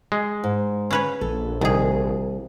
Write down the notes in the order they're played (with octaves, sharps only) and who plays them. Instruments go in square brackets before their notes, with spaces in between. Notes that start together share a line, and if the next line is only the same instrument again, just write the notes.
[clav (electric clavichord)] G#3
[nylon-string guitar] G#2
[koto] C#4 B4 C#5
[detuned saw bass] A#1 [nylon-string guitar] A4
[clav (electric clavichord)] C2 [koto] D#3 G#4